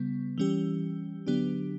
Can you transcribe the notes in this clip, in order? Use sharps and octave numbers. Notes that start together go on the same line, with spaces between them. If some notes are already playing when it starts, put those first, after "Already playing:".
Already playing: C#3 G3 B3
E3 G3 C#4 G4
D3 F#3 B3 D4 G4